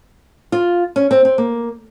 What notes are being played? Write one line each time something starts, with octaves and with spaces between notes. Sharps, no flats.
F4
C#4
C4
C4
A#3